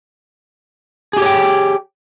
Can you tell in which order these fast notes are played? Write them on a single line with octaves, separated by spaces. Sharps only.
G#4 G4 C#5 G5